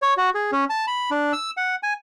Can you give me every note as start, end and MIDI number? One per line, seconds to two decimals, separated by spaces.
0.02 0.14 73
0.17 0.30 66
0.34 0.51 68
0.52 0.65 61
0.70 0.86 81
0.87 1.10 83
1.11 1.33 62
1.33 1.51 88
1.57 1.76 78
1.83 1.93 80